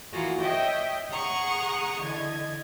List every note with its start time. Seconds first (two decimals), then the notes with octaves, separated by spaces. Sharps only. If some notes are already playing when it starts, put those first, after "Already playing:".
0.12 E3 A#3 F4 F#4 G#4
0.41 C#5 D#5 E5 G5 D#6
1.11 G#4 F#5 A#5 C#6 D#6
2.01 D3 E3 D#5 G#6